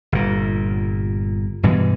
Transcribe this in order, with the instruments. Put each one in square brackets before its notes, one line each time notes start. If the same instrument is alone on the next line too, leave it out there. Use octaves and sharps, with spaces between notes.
[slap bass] G1 A#2
G2 B2 E3 G#3